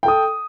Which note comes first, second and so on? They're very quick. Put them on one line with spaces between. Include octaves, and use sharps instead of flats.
G5 A4 D#6